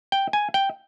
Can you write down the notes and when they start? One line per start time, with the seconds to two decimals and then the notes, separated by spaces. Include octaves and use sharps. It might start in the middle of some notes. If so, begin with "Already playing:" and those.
0.12 G5
0.33 G#5
0.54 G5